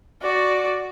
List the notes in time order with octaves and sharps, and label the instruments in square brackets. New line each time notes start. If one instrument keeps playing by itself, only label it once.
[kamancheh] F#4 D5